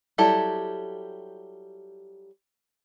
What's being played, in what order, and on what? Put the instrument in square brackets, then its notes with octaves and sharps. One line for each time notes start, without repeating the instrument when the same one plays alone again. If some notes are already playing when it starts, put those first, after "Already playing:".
[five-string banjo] F#3 G3 E4 G4 A4